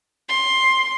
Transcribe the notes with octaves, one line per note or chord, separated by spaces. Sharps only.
C6